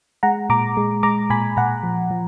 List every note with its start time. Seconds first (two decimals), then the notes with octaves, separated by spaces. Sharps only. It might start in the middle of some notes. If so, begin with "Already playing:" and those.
0.23 G#3 F#5 A#5
0.49 A#2 A#5 D6
0.77 G#3
1.03 G#3 A#5 D6
1.30 A#2 G#5 B5
1.57 A#2 F#5 A#5
1.83 F3
2.11 F3